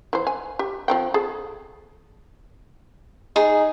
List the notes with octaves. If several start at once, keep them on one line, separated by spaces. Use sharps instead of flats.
E3 C5
G#5
G4
F3 C4 G5
G#4 A4
D#4 G#4